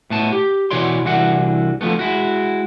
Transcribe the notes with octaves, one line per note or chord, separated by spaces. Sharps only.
A2 B3 A5
G4
B2 E3 F#4 C#5 D5 C6
C2 E3 D4 F#4 F#5
D3 F3 G#3 A3 B3
G#3 E4 F#4